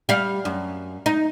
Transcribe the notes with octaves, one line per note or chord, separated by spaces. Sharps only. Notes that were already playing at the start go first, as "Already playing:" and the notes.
G3 F5
F#2
D#4